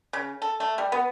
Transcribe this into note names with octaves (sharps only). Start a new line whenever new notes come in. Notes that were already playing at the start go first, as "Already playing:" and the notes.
C#3
A4
A3
G3
B3